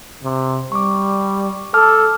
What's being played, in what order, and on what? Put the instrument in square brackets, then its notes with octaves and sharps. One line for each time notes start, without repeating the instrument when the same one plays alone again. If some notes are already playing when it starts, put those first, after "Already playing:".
[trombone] C3
[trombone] G3 [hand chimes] C#6 D6
[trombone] A4 [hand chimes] A5 D6 F6